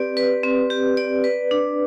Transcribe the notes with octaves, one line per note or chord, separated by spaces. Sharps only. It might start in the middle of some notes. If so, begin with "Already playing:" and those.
Already playing: C4 G4 B4 D5
B4
C4
G4
D5
B4
D4